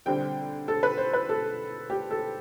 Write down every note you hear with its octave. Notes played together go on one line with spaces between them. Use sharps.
D3 G3 C4 G5
A4
B4
C5
B4
A4
G4
A4